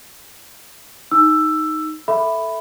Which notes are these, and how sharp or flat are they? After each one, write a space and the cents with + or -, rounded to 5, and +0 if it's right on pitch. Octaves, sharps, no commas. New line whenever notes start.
D#4 +0 E6 +10
A4 +0 E5 +0 B5 +5